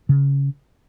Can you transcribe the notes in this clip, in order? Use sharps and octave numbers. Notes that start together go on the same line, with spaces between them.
C#3